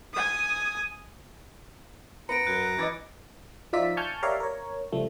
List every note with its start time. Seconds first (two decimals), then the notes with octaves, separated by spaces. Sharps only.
0.13 G#5 D#6
2.29 B3 B4 A#5 C#7 D7
2.47 F#2 F#6
2.78 E3 D#5 D6 A6
3.73 F3 D#4 F4 D5 E5 B6
3.97 G#5 A5 C#6 F6 G6
4.23 G4 A#4 C#5 D5 E5 F5
4.40 A#4 C#5
4.92 C#2 F3 G3 A3